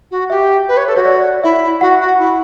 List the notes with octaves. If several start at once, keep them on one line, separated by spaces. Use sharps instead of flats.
F#4
G4 E5
B4
C#5
A4
F#4 C#5
D5
E4 E5
F#4 F#5
F#4
E4